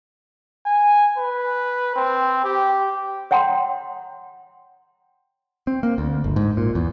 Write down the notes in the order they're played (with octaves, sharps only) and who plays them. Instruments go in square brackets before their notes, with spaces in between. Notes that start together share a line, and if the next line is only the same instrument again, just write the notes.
[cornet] G#5
B4
C4
G4
[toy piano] C#5 F#5 G5 A#5 C6
[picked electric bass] C4
A#3
D2
G1
G#2
A#2
E2